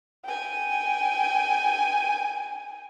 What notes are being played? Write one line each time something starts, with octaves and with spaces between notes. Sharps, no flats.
G5 G#5